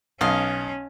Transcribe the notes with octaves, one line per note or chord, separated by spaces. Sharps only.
B1 C#4 D#5 F5